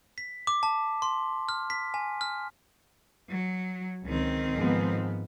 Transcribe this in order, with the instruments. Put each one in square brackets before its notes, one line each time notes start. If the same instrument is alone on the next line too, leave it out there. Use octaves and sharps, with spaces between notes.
[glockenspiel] B6
D6
A5
C6
F6
B6
G#5
F6
[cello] F#3
[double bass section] C#2 [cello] D#3 C4
[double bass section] G#2 F3 B3